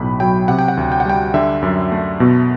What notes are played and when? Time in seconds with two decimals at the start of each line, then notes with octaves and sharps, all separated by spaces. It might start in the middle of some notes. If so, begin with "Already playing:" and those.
Already playing: B1 A2 B5
0.20 F#3 G5
0.48 C3 F#5
0.59 G5
0.68 F#5
0.77 D2
0.92 G5
1.00 F#5
1.06 G3 G5
1.34 D3 E5
1.63 F#2
1.92 A3
2.20 B2